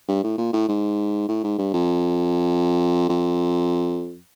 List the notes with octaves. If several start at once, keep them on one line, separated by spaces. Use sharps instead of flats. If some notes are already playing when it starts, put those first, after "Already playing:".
G2
A2
A#2
A2
G#2
A2
G#2
G2
F2
F2